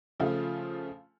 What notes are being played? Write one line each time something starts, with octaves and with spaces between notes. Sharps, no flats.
C#3 F3 A3 F4